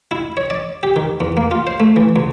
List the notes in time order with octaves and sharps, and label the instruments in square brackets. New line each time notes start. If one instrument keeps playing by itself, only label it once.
[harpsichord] E4
C#5
D5
G4
D#3
E2
A#3
F4
C5
A3
E3
C#2